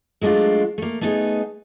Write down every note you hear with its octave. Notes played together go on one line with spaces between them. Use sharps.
F#3 G#3 A3 D4 F4
A3 A#3
A3 B3 D#4 G#4